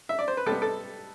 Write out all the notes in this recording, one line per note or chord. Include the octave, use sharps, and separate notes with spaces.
E5
D5
C5
B4
C3 G3 B3 A4
A4